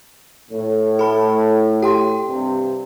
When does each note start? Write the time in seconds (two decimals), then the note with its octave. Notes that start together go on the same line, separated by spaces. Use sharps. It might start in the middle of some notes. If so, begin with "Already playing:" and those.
0.51 A2
0.99 A4 B5
1.82 G4 G5 C6
2.26 G2 C3